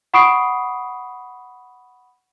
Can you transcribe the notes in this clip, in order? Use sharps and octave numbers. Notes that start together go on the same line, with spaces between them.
F#5 B5 C#6 D#6 C7 D7